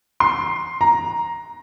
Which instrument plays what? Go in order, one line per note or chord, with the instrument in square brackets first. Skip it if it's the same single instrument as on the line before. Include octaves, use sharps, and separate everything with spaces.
[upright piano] C6
A#5